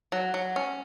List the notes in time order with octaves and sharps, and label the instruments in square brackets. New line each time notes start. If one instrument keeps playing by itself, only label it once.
[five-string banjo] F#3
F#3
C#4